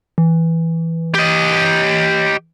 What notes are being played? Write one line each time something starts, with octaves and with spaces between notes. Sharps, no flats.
E3
G4 D#5